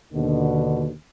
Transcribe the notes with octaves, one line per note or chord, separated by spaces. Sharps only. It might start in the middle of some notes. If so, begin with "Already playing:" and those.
D#2 B2 D3